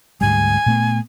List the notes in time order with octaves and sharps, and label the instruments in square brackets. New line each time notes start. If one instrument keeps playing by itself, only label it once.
[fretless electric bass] D2 G#2 G3 [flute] G#5
[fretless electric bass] A#2 A3 B3